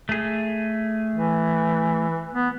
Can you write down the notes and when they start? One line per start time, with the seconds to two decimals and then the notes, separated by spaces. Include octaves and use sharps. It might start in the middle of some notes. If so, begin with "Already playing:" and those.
0.09 A3 G#4
1.15 E3
2.34 B3